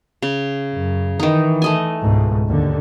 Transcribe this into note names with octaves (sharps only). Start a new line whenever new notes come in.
C#3
F#2
D#3 E3 D#4
A3 D#5 G#5
C#2 G#2 B2
D#2 D3